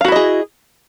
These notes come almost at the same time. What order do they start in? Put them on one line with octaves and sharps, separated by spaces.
F5 F#4 E4 D#5 G#4